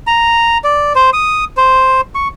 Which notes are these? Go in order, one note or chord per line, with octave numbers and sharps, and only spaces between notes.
A#5
D5
C5
D#6
C5
C#6